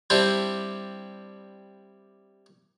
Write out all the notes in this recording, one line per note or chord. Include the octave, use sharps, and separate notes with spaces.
G3 C4 D4 E4 G4